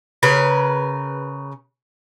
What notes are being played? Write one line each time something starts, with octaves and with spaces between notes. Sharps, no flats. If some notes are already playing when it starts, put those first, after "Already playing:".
C#3 A#4 B4